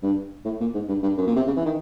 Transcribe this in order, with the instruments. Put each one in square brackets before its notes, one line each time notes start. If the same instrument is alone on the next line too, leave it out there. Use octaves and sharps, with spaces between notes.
[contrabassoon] G2
A2
A#2
G#2
G2
G2
F#2
A#2
C3
C#3
E3
D#3